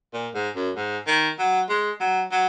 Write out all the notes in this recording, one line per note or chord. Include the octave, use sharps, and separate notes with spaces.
A#2
G#2
F#2
G#2
D#3
F#3
G#3
F#3
F#3